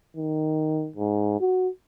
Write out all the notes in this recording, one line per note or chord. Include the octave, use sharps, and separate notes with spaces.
D#3
G#2
F#4